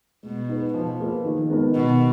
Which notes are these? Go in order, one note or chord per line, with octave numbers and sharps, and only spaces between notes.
B2 G#3
D#4 G#4 B4
B2 F3
A#3 F4 G#4 B4
D#3
G#3 B3 D#4 A#4
B2 D#3